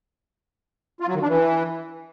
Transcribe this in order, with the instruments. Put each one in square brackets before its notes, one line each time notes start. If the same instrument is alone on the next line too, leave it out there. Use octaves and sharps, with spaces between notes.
[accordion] F4
F#3
D#3
D4
E3